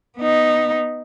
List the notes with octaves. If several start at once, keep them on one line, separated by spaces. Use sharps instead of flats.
B3 D#4